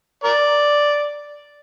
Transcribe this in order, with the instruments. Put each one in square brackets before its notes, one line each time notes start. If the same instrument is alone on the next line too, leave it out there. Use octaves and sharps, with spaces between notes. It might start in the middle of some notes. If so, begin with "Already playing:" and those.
[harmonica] A#4 D5